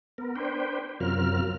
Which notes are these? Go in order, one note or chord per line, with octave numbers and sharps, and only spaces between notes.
B3 A#4
D4 B4 C5 G5
F#2 C3 F#3 F4 A#4 F6